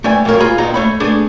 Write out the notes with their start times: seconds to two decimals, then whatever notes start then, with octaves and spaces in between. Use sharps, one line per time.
0.04 A3 B4 D5 G5 G#5
0.25 F2 G#2 F#3 A#3 A#4 C#5
0.40 F4 G#4 A#5 B5
0.58 D#2 A#2 D#3 B3 D#4 A#5
0.74 A3 C#5 B5
1.00 A3 B3 D4 G#4